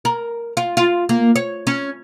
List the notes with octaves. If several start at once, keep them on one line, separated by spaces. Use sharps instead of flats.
A#4
F4
F4
A#3
C#5
C#4